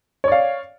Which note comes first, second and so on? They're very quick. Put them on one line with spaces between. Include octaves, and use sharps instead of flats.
C#5 D5 F5